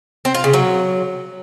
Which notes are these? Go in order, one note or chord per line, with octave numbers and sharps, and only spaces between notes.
C4
F4
C#3
F#3